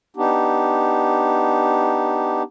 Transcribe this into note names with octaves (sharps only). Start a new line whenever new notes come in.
B3 D4 D#4 G4